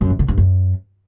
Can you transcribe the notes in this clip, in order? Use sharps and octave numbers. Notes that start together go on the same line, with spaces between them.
F#2
E3
D3
G2
F#2